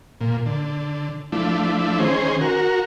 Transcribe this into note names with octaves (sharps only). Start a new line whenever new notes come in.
A#2
D3
F3 A3 D4 E4
D#3 C#4 G#4 C5
F#4 A#4